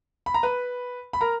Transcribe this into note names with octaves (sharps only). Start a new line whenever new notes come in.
B5
A#5
B4 B5
B5
A#4 A#5